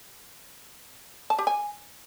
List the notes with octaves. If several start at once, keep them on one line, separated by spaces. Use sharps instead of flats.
A5
G4
G#5